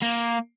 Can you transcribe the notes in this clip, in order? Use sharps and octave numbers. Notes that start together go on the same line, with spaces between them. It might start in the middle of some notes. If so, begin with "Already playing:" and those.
A#3